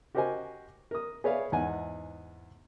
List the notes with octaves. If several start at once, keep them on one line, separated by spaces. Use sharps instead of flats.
F#4 G4 A#4 C5 D#5 G#5
A#4 D#6
G#4 B4 C#5 D5 E5 F5
E2 G#2 D#4 F#5 G#5